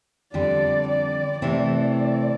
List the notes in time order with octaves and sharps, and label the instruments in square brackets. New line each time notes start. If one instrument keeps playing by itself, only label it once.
[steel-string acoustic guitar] F2 D3 G3 [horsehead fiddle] D5
[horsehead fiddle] D5
[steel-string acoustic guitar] C3 E3 A3 C4 E4 [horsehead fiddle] D5